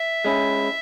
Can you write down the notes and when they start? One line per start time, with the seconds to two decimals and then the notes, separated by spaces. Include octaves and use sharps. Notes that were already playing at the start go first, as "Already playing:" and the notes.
Already playing: E5
0.25 G#3 C#4 E4